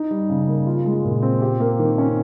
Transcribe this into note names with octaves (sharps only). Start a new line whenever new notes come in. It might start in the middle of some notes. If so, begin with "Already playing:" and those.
Already playing: D#4
G3
C#3
A#3
F4
G#3
A#2
C4
G4
A#3
D#3
C#4